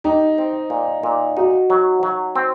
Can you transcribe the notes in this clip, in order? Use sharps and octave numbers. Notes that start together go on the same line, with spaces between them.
D#4 G4
C4
A#2
A#2
D#4 F#4
F#3
F#3
C4